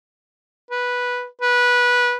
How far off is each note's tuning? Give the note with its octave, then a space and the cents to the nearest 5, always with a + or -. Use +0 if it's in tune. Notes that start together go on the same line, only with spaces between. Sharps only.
B4 -10
B4 -15